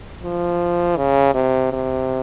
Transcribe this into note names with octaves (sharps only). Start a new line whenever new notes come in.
F3
C#3
C3
C3